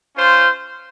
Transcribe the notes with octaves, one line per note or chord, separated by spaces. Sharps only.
C#4 F4 C5